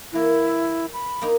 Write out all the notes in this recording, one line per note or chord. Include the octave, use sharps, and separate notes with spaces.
E3 A#3 E4
E5
B5
A#3 D#4